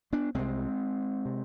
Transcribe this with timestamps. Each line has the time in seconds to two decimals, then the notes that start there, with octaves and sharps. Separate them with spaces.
0.13 B3 D4
0.34 C2 C3 G#3 C4
1.25 C3